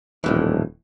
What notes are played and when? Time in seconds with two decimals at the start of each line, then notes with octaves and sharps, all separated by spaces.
0.24 D#1 F2 A2 E3